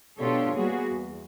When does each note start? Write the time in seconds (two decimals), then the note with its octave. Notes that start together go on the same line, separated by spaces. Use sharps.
0.20 B2 D4 F4 G4 A4 C#5
0.55 G3 A#3 B3 F#4 G#4
0.91 E2